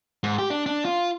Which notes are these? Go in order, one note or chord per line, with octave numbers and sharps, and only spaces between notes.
G#2
G4
D4
D4
F4